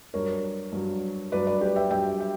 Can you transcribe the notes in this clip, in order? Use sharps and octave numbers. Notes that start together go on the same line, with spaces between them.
G2 F#3 A#4 C#5
G2 F#3
G2 F#3 B4 D5
B4 D5
G4 B4
E5 G5
G2 F#3 E5 G5
E5 G5